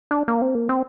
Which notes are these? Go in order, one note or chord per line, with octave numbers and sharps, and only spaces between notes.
D4
A#3
C4
A#3
C4